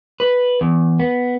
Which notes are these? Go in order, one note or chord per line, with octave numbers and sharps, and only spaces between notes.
B4
E2
B3